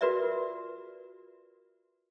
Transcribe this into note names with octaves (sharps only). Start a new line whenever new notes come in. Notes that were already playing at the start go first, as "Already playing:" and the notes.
F4 F#4 A#4 B4 D5 E5